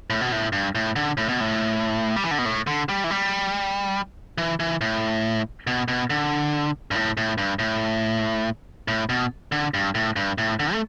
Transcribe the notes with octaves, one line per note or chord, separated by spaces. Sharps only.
A2
B2
A2
G2
A2
D3
A2
B2
A2
G3
E3
D3
B2
A2
D3
G3
E3
G3
E3
E3
A2
B2
B2
D3
G2
A2
A2
G2
A2
A2
B2
D3
G2
A2
G2
A2
D3
A3